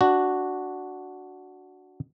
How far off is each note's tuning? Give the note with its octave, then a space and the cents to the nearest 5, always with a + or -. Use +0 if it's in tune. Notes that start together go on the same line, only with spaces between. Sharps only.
D4 +0 F#4 +0